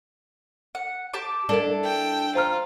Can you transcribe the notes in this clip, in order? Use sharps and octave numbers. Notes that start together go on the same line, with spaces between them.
F#5
G4 A5 D6
G3 D4 E4 A4 A#4
G5
F4 C5 A#5 F6